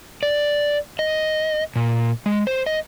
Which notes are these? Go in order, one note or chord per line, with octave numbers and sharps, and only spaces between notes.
D5
D#5
A#2
G#3
C5
D#5